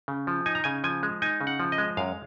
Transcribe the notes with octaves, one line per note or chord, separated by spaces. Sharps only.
C#3
F3
D#4 G#5
A#5
C#3 G#5
F3 G#5
G#3
D#4 G#5
C#3
F#5
F3
D#5
G#3
F#2 F5